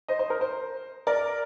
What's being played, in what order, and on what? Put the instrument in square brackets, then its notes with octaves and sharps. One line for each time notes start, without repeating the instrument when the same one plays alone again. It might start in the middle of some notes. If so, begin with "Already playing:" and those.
[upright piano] C5 D#5
C5
A#4
C5
A#4 D5